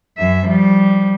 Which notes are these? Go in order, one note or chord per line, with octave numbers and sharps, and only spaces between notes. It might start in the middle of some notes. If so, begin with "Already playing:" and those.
F#2 E5
F3 G3